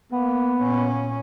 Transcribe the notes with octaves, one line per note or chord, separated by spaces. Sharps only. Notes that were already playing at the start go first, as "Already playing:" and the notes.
A#3 B3
A#2 C#4